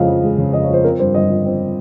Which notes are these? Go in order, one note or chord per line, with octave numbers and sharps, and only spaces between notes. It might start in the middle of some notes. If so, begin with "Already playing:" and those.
Already playing: F2 C#3 G#3 D#5 F5
F3
G#3
C#3
F2 D#5
C#5
F3 C5
C4 A#4
G2 C5
G1 D#5
F3
C4